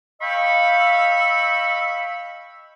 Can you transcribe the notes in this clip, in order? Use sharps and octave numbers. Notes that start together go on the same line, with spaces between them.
D#5 F5 G5 B5 C#6 E6